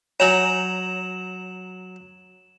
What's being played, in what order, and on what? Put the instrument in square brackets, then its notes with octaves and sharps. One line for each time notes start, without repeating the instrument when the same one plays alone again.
[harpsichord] F#3 A#5 [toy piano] C#5 G#5 [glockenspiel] E7 F#7